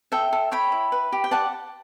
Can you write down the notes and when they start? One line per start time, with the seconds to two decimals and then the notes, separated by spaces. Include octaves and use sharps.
0.12 A4 E5 G5
0.33 A4
0.51 C#5 G5 B5
0.72 E4
0.92 B4
1.12 G4
1.24 G5
1.31 D5 F#5 A5